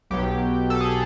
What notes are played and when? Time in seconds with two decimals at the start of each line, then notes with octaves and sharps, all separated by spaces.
0.11 B1 B2 F#3 G4
0.70 A4
0.80 G#4